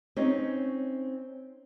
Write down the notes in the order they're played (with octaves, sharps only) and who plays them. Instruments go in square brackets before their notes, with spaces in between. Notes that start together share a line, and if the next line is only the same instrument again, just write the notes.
[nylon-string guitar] C4 C#4 D#4 C#5